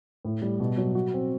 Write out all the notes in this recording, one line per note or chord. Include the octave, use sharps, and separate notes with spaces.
A2
G3
B2
F#3
F#4
C4